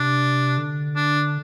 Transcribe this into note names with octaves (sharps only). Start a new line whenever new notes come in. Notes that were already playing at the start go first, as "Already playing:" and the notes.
Already playing: C3 D4
D3
D4